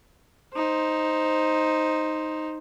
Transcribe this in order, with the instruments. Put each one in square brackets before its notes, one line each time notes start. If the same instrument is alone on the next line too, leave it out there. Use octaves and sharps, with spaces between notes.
[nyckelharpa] D#4 C5